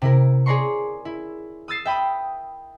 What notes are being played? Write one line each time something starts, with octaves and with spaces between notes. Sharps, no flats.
C3 E4 A#4
G#4 C#5 D5 A#5 C6 C#6
E4
D#6 E6 A6 C7
E5 G5 B5 D#6